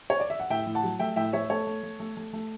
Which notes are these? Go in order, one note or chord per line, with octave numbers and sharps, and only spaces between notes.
C#5
D5
E5
F#5
A2 E5 G5
A2
F#5 A5
F#3
A3 E5 G5
A2 E5 G5
A3 C#5 E5
A3 A4 C#5
A3
A3
A3
A3
A3